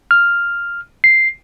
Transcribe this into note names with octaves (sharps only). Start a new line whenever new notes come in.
F6
C7